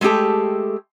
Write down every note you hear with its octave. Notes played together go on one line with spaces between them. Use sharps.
G#3 A3 B3 G4 A4